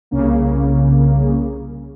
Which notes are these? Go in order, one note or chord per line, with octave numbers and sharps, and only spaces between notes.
C2 C#3 A#3